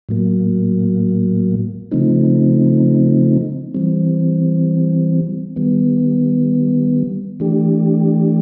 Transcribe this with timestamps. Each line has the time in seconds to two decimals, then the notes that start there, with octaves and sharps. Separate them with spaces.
0.09 A2 F#3 A#3
1.91 C#3 F3 A3 C4 D#4
3.74 E3 G3 C4
5.56 D#3 G3 B3
7.40 E3 A3 D4 G4